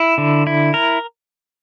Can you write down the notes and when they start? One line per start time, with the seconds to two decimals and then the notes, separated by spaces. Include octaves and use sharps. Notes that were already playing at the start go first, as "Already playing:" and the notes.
Already playing: E4
0.18 D3
0.47 E4
0.74 A#4